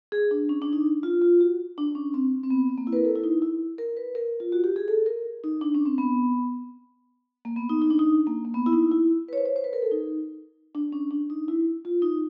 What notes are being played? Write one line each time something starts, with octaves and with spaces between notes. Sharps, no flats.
G#4
D4
C#4
D4
D#4
F4
F4
F#4
D4
C#4
C4
C4
B3
C4
A#3
E4
B4
A#4
A4
E4
D#4
E4
A#4
B4
A#4
F4
F#4
G4
G#4
A4
A#4
D#4
D4
C#4
C4
B3
A#3
B3
D#4
D#4
D4
D#4
A#3
A#3
B3
E4
D#4
E4
B4
C#5
C5
C#5
C5
B4
A#4
A4
D#4
D4
C#4
D4
D#4
E4
F4
D#4